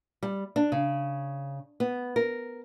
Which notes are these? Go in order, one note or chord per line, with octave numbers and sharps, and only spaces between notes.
G3
D4
C#3
B3
A#4